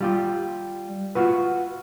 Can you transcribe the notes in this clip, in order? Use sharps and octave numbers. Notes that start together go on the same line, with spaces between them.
G3 F4 G4
F4 F#4 B4